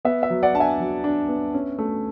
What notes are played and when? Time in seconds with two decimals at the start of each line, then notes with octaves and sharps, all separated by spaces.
0.05 B3 E5
0.23 E5
0.30 F#3
0.43 D5 F#5
0.55 D4 A5
0.60 E5 G#5
0.80 F#3
1.04 D4
1.28 B3
1.54 C#4
1.79 A3